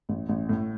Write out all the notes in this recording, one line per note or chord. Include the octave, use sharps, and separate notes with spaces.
A1
A1
A2